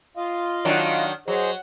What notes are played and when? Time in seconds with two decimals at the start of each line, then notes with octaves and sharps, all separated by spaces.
0.17 F4 D#5 F5
0.65 D#3 F#3 D4
1.28 F#3 G#4 C5 D#5